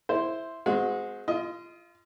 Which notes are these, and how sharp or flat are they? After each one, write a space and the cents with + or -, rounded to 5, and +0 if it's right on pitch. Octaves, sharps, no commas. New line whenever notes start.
E4 +0 C5 +0
G#3 +0 C4 -35 F#4 -25
F4 -25 D#5 +20